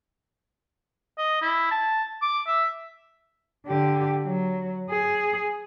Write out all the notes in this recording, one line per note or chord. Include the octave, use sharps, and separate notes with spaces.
D#5
E4
A5
D6
E5
D3 G4
F#3
G#4